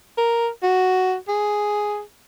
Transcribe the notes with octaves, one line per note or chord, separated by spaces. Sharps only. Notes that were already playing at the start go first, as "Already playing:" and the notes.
A#4
F#4
G#4